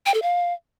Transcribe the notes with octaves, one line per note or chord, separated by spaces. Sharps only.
G5
A4
F5